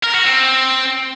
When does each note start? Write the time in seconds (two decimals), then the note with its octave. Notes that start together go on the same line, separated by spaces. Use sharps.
0.03 A#4
0.14 F#4
0.25 C4